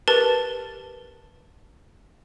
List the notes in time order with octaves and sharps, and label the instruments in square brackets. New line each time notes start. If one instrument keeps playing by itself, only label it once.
[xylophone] G4 A#4 B4 A5 A6